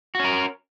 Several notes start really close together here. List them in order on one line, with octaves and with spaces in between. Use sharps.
F#4 C#4 A#4